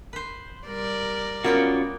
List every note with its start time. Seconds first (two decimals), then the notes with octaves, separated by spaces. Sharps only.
0.13 B4 C5
0.68 G3 A#4 D5
1.44 A#3 B3 C#4 F4 F#4 G5